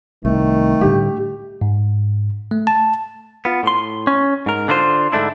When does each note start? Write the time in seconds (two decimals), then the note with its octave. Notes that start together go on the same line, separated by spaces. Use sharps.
0.25 C2 D#3 A3
0.81 A2 D3 G3 G4
1.61 G#2
2.51 A3
2.67 A5
3.45 B3 F4
3.63 A2 C6
4.07 C#4
4.46 G#2 A#4
4.68 D3 D4 E4 F4 C5
5.12 G#2 D3 A3 D4 E4